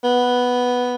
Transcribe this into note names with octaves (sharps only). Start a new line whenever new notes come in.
B3